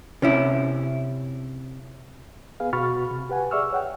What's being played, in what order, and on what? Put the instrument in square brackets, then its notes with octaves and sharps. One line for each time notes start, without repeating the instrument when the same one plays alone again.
[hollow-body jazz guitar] C3 C#4 E4
[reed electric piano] B3 G#4 B4 F5
B2 F#4 B5 C#6 F6 A6
C3
G4 B4 F#5 G#5
G#4 D5 E5 C#6 E6 F6
C#5 F#5 G5